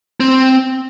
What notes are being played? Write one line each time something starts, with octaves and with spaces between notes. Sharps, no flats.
C4